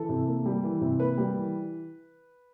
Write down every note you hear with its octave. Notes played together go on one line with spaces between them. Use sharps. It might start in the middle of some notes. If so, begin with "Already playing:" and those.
Already playing: E3 A4
C3
A#3
G3
E3
C3
A#3 B4
G3
E3